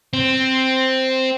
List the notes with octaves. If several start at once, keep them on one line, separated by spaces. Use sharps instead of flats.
C4